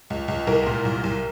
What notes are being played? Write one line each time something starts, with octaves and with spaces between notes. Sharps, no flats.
C#2
C#2
C2 A#4
A#2
C2
C2